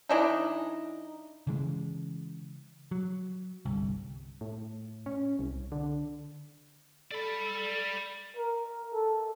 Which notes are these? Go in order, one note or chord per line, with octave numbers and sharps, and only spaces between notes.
E3 D4 D#4
C#3 E3 G#3
F#3
G1 C2
A2
C#4
C2
D3
A4 D5 B5
A#4
A4